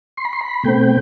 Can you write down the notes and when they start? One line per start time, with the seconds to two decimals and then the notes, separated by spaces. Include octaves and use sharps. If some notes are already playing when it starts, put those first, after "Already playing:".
0.17 C6
0.25 B5
0.33 C6
0.41 B5
0.63 B2 A3 C4 G5